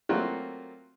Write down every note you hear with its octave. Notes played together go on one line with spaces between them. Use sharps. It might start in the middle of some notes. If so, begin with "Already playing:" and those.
F#3 A3 A#3 C4 F4 F#4